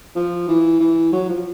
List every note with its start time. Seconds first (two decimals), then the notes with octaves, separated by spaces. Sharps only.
0.15 F3
0.48 E3
0.80 E3
1.12 F#3
1.29 F3